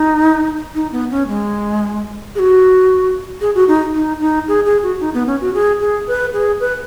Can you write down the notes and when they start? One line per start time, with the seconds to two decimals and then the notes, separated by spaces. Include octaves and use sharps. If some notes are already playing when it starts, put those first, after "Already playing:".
Already playing: D#4
0.75 D#4
0.92 B3
1.11 C#4
1.28 G#3
2.35 G#4
2.39 F#4
3.41 G#4
3.55 F#4
3.68 D#4
3.94 D#4
4.20 D#4
4.48 G#4
4.65 G#4
4.83 F#4
5.01 D#4
5.14 B3
5.27 C#4
5.41 F#4
5.54 G#4
5.81 G#4
6.07 B4
6.33 G#4
6.60 B4